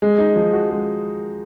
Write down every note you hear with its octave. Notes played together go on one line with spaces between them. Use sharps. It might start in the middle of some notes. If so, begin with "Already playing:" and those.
G#3
D#4
F3
F#4
G#3